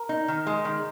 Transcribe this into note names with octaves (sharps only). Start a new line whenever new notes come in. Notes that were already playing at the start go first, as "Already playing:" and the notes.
Already playing: A#4
D#4
D#3
G#3
D#3